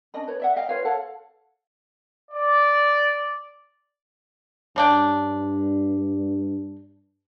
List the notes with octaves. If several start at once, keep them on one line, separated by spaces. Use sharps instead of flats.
C#4 D4 D#5 B5
B4 C#5
D5 E5 F#5
D#5 F5 G5
F4 B4 C#5 F5
A4 C#5 F5 F#5
D5
G2 C#3 D4 G5